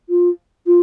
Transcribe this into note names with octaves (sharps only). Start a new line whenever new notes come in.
F4
F4